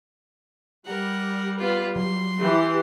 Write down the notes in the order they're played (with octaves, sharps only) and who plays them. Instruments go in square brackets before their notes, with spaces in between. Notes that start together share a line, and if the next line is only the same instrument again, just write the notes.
[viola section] G3 [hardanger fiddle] A#4 F#5
[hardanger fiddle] B3 F4
[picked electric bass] F#3 [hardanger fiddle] C6
[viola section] E3 G4